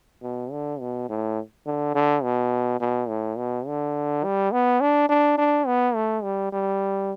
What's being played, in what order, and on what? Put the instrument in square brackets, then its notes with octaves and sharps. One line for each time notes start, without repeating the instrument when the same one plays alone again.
[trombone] B2
D3
B2
A2
D3
D3
B2
B2
A2
B2
D3
G3
B3
D4
D4
D4
B3
A3
G3
G3